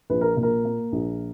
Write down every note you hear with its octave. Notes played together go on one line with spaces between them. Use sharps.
A#1 B4
A#4
A#2
A#4
A#3
A#1